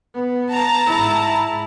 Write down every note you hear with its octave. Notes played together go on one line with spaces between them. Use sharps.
B3
A5 A#5
G#2 E4